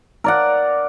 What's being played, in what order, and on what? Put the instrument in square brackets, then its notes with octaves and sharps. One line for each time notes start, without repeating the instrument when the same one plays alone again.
[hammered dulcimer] A#4 D5 F#5